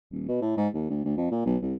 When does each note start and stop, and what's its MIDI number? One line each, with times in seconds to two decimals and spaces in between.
0.12 0.25 27
0.28 0.41 47
0.41 0.57 45
0.57 0.68 44
0.74 0.87 39
0.90 1.01 38
1.05 1.15 38
1.17 1.31 41
1.31 1.45 46
1.46 1.57 35
1.62 1.75 36